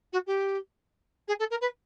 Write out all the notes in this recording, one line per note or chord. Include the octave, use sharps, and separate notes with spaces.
F#4
G4
G#4
A4
A#4
B4